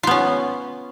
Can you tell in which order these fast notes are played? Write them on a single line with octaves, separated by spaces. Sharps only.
F4 B3 C#4